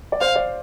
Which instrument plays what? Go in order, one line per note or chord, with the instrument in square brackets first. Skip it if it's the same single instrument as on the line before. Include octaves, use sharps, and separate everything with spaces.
[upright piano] D5
[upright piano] C5 [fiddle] F5
[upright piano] D5